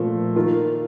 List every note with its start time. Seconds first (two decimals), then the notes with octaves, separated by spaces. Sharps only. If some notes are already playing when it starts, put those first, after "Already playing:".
Already playing: A#2 F3 A3
0.36 D#3 A#3 F4 A#4